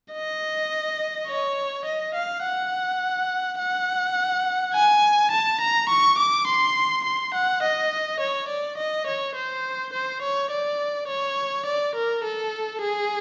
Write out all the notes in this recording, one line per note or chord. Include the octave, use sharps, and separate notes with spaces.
D#5
C#5
D#5
F5
F#5
F#5
G#5
A5
A#5
C#6
D6
C6
C6
F#5
D#5
C#5
D5
D#5
C#5
C5
C5
C#5
D5
C#5
D5
A#4
A4
G#4